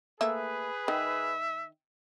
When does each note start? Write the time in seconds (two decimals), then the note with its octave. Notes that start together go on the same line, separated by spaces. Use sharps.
0.21 A3 A#3 G#4 B4 E5
0.88 D#3 E5